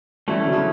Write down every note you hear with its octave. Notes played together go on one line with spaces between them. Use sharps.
E3 G3 A3 C#4 E4
D3 F#3
C#3 E3